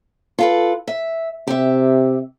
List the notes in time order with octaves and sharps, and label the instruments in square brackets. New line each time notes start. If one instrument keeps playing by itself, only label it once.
[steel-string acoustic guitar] F4 A4 B4
E5
[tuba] C3 [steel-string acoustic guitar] G4 E5